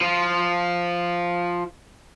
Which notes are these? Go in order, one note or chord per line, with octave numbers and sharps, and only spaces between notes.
F3 F4